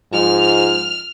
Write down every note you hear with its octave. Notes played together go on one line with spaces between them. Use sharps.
G#2 F3 F6